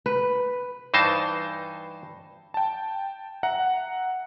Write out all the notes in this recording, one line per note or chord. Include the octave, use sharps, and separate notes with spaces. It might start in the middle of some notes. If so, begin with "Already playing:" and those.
B4
G2 E3 D#4 C5 A5
G5 A5
E5 F#5 A#5